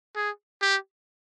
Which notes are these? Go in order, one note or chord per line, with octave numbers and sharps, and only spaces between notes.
G#4
G4